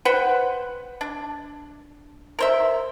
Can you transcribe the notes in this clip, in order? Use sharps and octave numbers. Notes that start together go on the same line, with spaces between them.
B4 C5 F#5 G5
D4
A#4 C5 E5